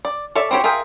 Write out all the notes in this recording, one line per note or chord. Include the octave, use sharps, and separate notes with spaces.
D5
A4 C#5 D5 E5
C4 E4 F#4 G4 C#5
F4 G#4 A#4 E5 G5